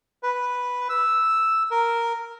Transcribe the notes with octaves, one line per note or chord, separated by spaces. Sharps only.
B4
E6
A#4